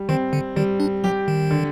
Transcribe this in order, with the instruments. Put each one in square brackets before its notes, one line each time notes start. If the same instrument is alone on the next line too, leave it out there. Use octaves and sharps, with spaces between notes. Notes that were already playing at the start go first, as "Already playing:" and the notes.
Already playing: [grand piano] G3
[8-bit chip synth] D#3 [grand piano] C4
[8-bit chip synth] D3
[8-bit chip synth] D#3 [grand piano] G3
[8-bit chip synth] D4
[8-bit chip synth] F#3 [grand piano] G4
[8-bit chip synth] D#3
[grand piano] D3